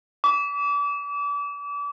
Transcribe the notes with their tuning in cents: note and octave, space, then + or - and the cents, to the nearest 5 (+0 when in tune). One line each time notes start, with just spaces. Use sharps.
D6 -35